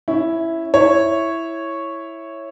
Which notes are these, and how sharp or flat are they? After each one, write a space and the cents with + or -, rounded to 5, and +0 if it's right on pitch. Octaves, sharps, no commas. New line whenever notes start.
C#4 +0 E4 +0
E4 +0 C#5 -5